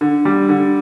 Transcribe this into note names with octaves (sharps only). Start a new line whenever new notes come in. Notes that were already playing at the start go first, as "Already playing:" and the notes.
D3
G3
D3